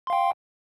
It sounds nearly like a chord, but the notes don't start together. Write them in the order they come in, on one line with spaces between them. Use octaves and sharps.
C6 F5 G5